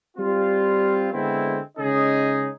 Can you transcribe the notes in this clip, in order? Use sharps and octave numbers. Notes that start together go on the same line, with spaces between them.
G3 C4 F4
D3 G#3 B3 C4 E4
C#3 G#3 C#4 D#4 G#4 D#5